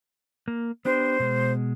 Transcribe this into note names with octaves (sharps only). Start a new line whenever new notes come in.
A#3
B3 D4 G4 C5
B2 G#3